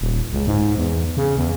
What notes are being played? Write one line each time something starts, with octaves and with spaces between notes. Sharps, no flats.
D#1
C#2
G#2
E2
C#3
E2